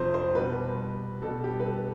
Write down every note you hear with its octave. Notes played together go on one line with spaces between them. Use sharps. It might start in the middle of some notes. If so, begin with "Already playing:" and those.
Already playing: F2 C3 F3 C5
C5
B2 G3 B4
B2 G3 A4
G4
B4
A4